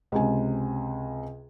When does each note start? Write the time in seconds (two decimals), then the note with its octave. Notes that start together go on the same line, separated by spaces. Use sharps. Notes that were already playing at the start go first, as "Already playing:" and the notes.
0.12 C#2 C3 G#5